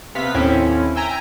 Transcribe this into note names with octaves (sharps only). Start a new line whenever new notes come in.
C3 B3 F5 B6
D#2 A2 C4 C#4 E4
E5 G5 G#5 A#5